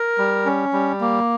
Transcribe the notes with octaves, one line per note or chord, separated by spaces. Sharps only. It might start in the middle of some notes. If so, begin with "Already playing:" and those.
Already playing: A#4
G3
C#4
G3
A#3